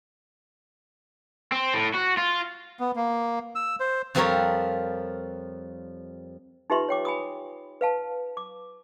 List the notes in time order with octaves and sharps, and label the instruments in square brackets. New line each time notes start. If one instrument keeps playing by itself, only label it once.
[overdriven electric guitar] C4
A2
F#4
F4
[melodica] B3
A#3
E6
C5
[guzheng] F2 F3 G3 C4 A#4 C#5
[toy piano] D#4 F4 G4 B4 E5 C6
C#5 G5 D6
G#5 B5 D#6
B4 F5 A5
D6